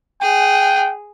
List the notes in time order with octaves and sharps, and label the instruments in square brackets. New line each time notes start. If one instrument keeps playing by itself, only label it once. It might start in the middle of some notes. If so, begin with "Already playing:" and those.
[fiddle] G#4 [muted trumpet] G5